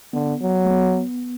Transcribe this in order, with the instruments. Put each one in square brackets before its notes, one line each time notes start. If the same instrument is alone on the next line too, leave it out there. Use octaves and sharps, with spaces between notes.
[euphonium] D3 [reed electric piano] B3
[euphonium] F#3
[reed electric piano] A3
B3